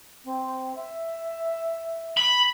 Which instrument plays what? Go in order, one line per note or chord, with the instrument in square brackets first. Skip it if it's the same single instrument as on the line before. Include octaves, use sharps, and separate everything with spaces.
[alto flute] C4
E5
[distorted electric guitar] B5